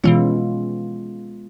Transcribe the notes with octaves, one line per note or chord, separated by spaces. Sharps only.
B2 E3 G#3 B3 C#4 F4